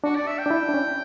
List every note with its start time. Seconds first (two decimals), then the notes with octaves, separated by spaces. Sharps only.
0.04 D4 F#4
0.16 D5
0.27 E5
0.39 G5
0.46 D4
0.50 E4
0.69 D4
0.74 C#4